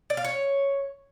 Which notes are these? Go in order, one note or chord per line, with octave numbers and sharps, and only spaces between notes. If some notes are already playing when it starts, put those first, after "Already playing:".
D5
F5
C#5